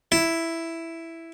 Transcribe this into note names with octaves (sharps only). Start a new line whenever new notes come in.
E4